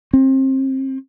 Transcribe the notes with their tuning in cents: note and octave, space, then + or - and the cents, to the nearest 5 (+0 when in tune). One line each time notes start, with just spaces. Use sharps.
C4 +30